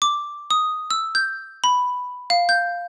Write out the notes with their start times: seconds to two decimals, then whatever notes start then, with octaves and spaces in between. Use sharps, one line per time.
0.02 D6
0.51 D#6
0.91 E6
1.15 G6
1.64 B5
2.30 F5
2.49 G6